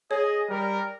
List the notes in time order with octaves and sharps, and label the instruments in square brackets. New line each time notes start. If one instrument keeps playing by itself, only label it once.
[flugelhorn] G#4 [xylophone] C#5 [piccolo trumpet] D#5
[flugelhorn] G3 [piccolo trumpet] A#4